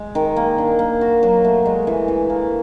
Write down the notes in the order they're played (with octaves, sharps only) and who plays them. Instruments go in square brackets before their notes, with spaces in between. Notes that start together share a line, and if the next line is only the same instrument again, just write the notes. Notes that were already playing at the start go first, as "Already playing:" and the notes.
Already playing: [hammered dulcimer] G#3
D#3
A#3
D4
A#3
F#4
F#3
A3
G#3
E3
E3
A#3